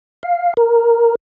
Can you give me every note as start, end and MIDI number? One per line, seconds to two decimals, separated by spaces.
0.23 0.54 77
0.57 1.15 70